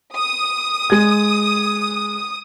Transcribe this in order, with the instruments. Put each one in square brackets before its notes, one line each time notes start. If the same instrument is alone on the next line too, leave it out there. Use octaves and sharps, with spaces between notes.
[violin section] D#6
[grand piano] G#3 G#6